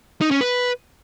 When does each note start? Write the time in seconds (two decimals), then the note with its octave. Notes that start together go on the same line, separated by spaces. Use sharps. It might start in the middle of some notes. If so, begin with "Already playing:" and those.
0.21 D#4
0.31 C#4
0.41 B4